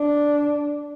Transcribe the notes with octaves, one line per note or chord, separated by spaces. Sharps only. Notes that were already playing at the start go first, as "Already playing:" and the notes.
Already playing: D4